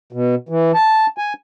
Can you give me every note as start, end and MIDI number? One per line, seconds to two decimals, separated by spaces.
0.13 0.35 47
0.49 0.72 52
0.74 1.06 81
1.18 1.33 80